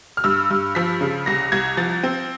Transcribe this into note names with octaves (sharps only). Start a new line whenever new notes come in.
F6
G2 E6
G2
F3 B6
C#3
C2 A#6
C2 G#6
F3 A6
C4